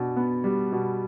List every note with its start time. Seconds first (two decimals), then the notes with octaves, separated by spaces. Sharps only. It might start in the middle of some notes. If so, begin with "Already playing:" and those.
Already playing: B2 B3 D4
0.17 B3
0.44 G3
0.72 B2